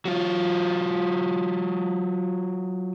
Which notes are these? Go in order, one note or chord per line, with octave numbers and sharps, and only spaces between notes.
F#3 F4